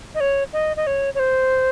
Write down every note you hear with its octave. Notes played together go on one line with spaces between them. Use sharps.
D#5
C#5
D#5
D#5
C#5
C#5
C5